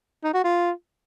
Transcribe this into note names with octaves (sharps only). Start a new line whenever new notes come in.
D#4
F#4
F4